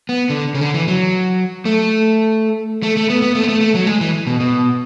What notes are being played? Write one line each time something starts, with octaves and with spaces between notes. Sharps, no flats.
B3
D3
C#3
D3
E3
F#3
A3
A3
A3
B3
B3
A3
B3
A3
A3
F#3
G#3
E3
B2
B2